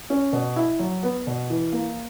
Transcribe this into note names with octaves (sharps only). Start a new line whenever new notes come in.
C#4
B2
E4
F#3
B3
B2
E3
A#3